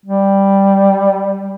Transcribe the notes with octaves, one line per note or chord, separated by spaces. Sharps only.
G3